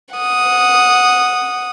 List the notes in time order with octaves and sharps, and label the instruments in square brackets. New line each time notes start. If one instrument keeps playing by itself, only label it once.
[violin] F#5 D#6